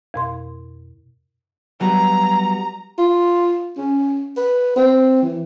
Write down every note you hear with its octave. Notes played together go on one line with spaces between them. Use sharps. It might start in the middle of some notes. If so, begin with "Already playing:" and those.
F2 B2 C6
F#3 G3 B3 A#5
F4
C#4
B4
C4
E3